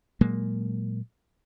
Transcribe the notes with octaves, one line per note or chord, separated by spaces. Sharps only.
A#2 F#3 G#3 A#3